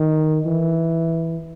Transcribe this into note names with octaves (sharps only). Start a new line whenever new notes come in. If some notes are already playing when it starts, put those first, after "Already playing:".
Already playing: D#3
E3